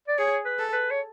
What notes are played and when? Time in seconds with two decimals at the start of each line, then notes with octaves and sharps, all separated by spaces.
0.08 D5
0.18 G#4 C#5
0.45 B4
0.59 A4
0.73 B4
0.91 C#5